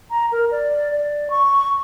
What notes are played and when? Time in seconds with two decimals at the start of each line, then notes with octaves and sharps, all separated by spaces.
0.10 A#5
0.32 A#4
0.51 D5
0.92 D5
1.30 C#6